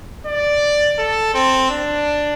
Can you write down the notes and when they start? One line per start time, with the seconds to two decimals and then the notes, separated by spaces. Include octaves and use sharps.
0.26 D5
0.98 A4
1.34 C4
1.70 D4